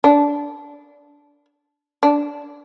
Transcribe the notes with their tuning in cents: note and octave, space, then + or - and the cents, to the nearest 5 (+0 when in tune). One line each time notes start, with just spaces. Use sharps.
D4 -15
D4 -10